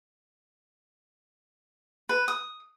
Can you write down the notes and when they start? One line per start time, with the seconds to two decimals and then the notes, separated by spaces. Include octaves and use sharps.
2.09 B4
2.28 D#6